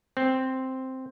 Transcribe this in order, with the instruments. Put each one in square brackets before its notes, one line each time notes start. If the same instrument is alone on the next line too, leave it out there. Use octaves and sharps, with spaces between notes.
[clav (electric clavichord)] C4